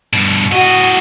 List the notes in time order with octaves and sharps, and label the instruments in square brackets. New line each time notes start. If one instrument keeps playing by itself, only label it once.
[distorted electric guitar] G2 B2
[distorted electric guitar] A2 D#5 [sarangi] F#4